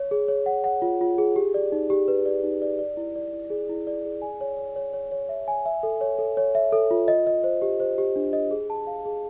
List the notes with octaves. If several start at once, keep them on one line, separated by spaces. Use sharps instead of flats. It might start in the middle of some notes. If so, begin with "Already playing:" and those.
Already playing: C#5
G#4
C#5
F#5
F#5
F4
F4
G#4
G4
D5
D#4
G4
B4
D5
D#4
D5
D5
E4
D5
E4
G#4
E4
D5
G#4
G#5
C#5
C#5
C#5
C#5
C#5
E5
G#5
E5
A4
C#5
A4
C#5
E5
A4
F4
D#5
D#5
C5
G4
C5
G4
D4
D#5
G#4
A5
F5
G#4